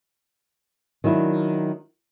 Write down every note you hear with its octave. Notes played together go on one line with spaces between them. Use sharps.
D#3 F#3 D4 E4